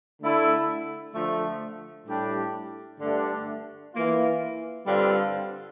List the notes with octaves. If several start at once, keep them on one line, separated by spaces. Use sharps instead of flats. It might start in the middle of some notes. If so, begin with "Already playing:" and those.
D3 A3 E4
D3 F3 A3
A2 G3 D4 G4
G2 D3 A3 D4 G4
E3 A#3 F4
G2 D3 G3 C4 F4